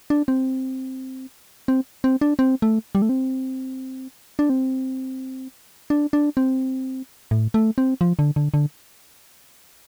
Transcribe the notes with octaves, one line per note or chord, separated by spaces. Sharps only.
D4
C4
C4
C4
D4
C4
A3
G3
A3
C4
D4
C4
D4
D4
C4
A2
A3
C4
F3
D3
D3
D3